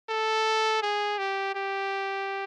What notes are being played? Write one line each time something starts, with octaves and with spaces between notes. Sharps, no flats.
A4
G#4
G4
G4